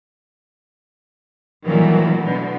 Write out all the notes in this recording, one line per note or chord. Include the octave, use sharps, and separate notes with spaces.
A#2 D#3 E3 F#3 G3 A3
B2 D3